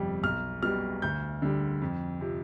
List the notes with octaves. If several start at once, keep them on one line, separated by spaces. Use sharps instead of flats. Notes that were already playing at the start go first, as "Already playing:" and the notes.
Already playing: G1 F2 C3 G3
B1 F6
B2 G3 F6
D2 G6
D3 G3
F2
C3 F3